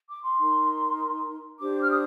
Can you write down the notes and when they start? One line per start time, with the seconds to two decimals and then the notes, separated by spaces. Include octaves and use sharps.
0.08 D6
0.24 C6
0.39 D#4 A#4
1.60 D4 G4 C5 D6
1.80 F6
1.91 D#6